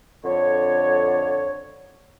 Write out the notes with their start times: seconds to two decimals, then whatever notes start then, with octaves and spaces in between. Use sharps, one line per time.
0.24 F2 D3 C#5